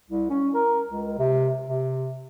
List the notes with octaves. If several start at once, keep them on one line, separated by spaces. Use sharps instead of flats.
C2
C#4
A#4
C#2
C3
C3